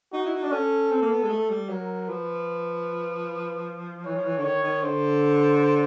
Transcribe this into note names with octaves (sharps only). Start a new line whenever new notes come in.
D#4 F#4
E4
D#4
D4
C#4 A4
C4
A#3
B3
G#3
A3
G3
F#3 A#4
F3 B4
E3 C#5
F3
E3
D3
D#3 C#5
D#3
D3 C5